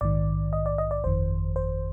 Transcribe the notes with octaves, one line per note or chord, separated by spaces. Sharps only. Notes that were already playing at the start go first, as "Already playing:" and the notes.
A#1 G#2 D#3 D5
D#5
D5
D#5
D5
G1 F2 D#3 C5
C5